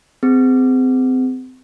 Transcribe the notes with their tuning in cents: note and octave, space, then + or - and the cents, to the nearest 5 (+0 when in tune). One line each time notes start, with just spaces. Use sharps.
C4 -30 G#4 -15